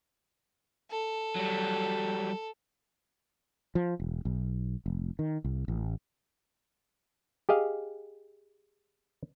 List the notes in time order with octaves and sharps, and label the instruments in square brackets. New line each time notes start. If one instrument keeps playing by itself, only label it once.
[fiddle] A4
[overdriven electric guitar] F#3 G3
[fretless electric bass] F3
E1
B1
F1
D#3
C2
A1
[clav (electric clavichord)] G4 G#4 D#5 F5